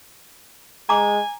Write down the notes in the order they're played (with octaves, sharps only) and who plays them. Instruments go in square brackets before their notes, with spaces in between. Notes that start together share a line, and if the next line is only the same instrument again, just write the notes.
[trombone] G#3 [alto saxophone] G#5 [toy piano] A#5 D6